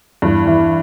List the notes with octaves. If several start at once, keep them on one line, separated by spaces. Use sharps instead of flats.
E2 G2
E3